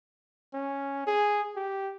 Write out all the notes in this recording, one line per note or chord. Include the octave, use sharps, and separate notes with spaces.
C#4
G#4
G4